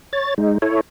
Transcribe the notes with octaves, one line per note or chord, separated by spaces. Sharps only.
C#5 A6
G#3 D#4
E4 A4 C#5